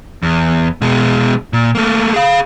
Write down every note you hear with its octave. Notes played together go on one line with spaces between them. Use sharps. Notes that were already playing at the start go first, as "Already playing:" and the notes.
E2
B2 G#3
A#2
A3 A#3
G#4 F5